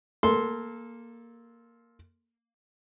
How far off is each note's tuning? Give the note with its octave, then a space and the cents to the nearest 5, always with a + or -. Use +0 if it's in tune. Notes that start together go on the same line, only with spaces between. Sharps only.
A#3 +0 A4 -20 C6 +0